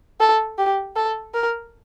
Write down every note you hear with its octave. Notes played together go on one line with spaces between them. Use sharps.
A4
G4
A4
A#4